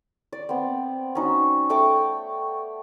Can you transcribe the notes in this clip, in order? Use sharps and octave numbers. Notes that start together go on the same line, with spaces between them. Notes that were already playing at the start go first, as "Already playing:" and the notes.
D5
B3 C4
C#4 D#4 F#4
A3 G5 C#6 D6